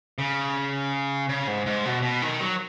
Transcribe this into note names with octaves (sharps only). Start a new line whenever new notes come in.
C#3
C#3
G#2
G#2
B2
B2
D#3
F#3